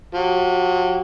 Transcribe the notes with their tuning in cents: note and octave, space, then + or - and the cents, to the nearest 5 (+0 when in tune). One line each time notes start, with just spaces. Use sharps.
F#3 -40 F#4 +45